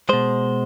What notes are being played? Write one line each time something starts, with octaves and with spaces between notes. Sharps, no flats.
B2 G#3 C5